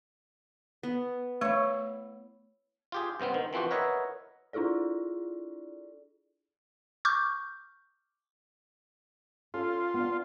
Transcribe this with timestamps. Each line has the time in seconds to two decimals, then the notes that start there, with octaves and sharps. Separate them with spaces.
0.83 B3
1.41 A3 E4 C#5
2.92 F4 G4 G#4
3.20 G2 C3 B3 C4
3.34 D#3
3.53 E3 F3 C4 F#4 G4
3.71 A#4 B4 C#5 D#5 E5 F#5
4.53 D4 E4 F4 G#4 A4 D5
7.05 C#6 D6 F6 G6
9.54 C#4 F4 A4
9.94 B3 D4